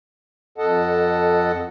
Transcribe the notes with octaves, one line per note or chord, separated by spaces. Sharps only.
F2 A4 D#5 F#5 A5